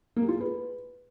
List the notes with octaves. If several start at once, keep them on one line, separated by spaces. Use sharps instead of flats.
A#3
G4
F4
G#4
B4